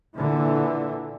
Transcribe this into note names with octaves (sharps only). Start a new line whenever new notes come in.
A#2 D3 E3